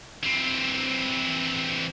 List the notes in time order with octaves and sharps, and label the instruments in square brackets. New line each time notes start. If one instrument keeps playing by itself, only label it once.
[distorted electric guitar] E3 C4